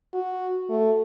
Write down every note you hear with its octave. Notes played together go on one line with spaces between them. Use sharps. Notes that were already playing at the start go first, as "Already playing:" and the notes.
F#4
A3